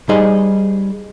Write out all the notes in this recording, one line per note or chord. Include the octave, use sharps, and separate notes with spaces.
G3 D#4 G#4 C5 D#5